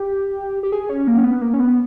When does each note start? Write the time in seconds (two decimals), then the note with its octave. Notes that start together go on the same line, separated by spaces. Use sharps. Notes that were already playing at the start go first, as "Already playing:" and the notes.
Already playing: G4
0.63 G4
0.72 G#4
0.89 C#4
1.07 A#3
1.18 C#4
1.24 B3
1.41 A#3
1.54 C#4
1.60 B3